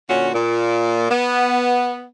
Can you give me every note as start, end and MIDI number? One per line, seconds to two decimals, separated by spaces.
0.09 0.29 46
0.09 0.29 50
0.09 0.29 61
0.09 0.29 66
0.34 1.08 46
1.11 2.05 59